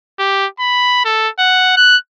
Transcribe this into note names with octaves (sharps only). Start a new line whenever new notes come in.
G4
B5
A4
F#5
F#6